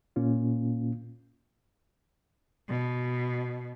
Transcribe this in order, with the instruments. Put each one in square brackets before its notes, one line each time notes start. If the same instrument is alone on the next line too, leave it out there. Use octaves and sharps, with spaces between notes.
[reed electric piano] A#2 A#3 C#4 F4
[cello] B2